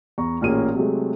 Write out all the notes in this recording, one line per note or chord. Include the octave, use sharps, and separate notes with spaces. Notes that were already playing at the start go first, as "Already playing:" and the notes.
E2 A#5 C#6
A1 A#2 A#3 C#4 G#4 D#7
C3 F#3 G#3 A3